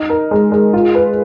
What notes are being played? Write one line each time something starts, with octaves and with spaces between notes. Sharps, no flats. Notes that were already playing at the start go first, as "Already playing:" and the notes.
Already playing: D#4
A#4
G#3
G#3
F4
B4